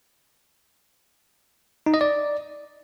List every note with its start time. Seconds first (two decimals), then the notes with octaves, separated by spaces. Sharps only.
1.86 D#4
1.94 D#5
2.01 D5